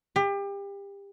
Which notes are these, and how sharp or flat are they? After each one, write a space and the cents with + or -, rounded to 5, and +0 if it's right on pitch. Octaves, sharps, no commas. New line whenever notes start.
G4 +30